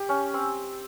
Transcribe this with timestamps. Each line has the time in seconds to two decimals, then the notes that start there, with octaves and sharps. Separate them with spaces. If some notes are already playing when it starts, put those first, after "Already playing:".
Already playing: G4
0.09 C#4
0.34 C4